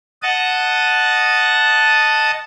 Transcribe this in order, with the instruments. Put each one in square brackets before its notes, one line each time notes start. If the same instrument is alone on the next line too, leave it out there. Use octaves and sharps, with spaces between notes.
[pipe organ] D#5 F#5 A5 D#6